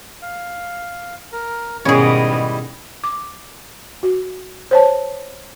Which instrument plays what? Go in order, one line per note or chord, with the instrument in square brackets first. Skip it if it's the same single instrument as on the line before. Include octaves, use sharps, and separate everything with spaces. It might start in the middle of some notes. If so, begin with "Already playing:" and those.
[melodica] F5
A#4
[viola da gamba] G#2 B2 D#3 [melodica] G3 E4 D#5 [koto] C#4 G#4
[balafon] D6
F#4
C5 C#5 A5